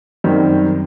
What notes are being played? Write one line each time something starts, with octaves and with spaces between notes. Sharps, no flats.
F#2 D#3 G3 C4